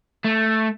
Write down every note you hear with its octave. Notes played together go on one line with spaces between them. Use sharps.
A3